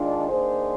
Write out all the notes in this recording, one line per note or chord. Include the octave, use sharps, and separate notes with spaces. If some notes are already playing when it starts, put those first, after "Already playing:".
Already playing: D#3 G#3 D4 F4
D#3 A#3 D4 G#4 C5